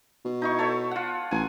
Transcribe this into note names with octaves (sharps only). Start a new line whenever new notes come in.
B2
D#4 E4 C#6
A4 C#5 E5
F4 F#5
A1 G#5